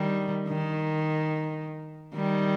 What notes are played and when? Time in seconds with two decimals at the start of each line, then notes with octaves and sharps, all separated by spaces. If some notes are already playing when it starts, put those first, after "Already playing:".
Already playing: D#3 G3
0.48 D#3
2.14 D#3 G3